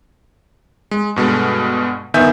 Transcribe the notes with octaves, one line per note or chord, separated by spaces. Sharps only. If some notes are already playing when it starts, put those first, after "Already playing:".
G#3
G2 B2 G#3 A4
G1 D#3 B3 E5 G#5 G6